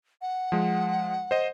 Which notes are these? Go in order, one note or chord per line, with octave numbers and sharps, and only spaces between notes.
F#5
F3 G#3
C5 D#5